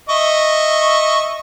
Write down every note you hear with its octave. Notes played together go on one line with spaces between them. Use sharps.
D#5 E5 C#6